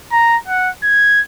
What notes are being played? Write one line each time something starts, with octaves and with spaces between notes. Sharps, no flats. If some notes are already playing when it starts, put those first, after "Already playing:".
A#5
F#5
G#6